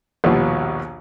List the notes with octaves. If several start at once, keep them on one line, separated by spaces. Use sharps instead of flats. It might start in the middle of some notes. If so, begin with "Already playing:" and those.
A#1 D#2 B2 G3 F4 F#4